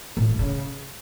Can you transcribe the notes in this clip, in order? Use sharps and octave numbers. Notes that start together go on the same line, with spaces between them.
A2
G2
C#3